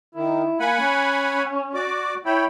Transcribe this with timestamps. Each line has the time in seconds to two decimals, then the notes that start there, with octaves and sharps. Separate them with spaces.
0.15 D#3 E4
0.60 A#3 F#5 G#5 B5
0.80 C#4
1.74 F#4 D5 D6
2.26 E4 C#5 G5 B5